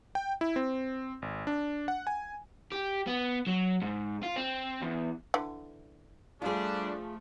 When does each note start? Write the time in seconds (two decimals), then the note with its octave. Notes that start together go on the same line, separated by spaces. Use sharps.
0.15 G5
0.41 E4
0.56 C4
1.22 G#1
1.47 D4
1.88 F#5
2.07 G#5
2.72 G4
3.07 B3
3.47 F#3
3.82 G#2
4.23 F4
4.36 C4
4.82 E2
5.34 D3 E3
6.42 F3 G3 A3 D4 F4 G#4